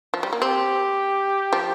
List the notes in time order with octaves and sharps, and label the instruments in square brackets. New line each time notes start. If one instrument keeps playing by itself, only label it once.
[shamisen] F3
G3
A#3
[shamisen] C4 [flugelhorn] G4
[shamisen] F3